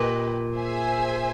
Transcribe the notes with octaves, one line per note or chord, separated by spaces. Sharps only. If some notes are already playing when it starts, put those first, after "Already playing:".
Already playing: A#2 G4 B4 D#5
G#4 C5 E5 G#5